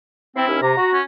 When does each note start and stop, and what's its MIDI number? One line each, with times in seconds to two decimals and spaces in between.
0.36 0.46 60
0.36 0.58 64
0.48 0.59 39
0.48 0.59 61
0.62 0.72 48
0.62 0.92 82
0.77 0.98 66
0.93 1.03 61